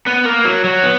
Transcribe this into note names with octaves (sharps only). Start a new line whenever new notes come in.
B3
A#3
F#3
F#3
B3